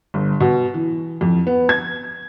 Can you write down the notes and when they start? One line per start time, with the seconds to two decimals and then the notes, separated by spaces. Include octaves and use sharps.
0.14 G1
0.40 B2
0.74 E3
1.21 F2
1.47 B3
1.69 G#6